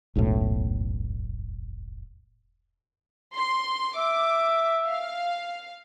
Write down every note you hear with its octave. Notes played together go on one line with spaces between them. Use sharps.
E1 B1 F#2 A2
C6
E5 D6
F5